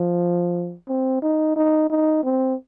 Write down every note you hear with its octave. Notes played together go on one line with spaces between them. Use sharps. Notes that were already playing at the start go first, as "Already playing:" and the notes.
Already playing: F3
C4
D#4
D#4
D#4
C4